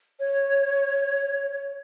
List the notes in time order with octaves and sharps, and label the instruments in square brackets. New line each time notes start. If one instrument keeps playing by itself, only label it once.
[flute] C#5